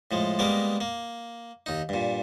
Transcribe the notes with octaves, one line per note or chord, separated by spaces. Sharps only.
A2 F3 G#3
G3 G#3 A#3 B3 A#4
A#3
D#2 D#4
G2 A#2